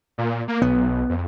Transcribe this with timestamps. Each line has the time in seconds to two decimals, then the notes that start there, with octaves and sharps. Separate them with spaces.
0.18 A#2
0.48 A#3
0.62 B1 B3
1.09 F2